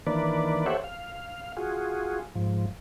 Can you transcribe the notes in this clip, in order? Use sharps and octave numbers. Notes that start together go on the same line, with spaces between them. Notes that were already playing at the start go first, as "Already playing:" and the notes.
D#3 E3 A#3 D4 B4 D5
G4 A4 C5 C#5 E5 F#5
F5
F4 F#4 G#4
G#2 F3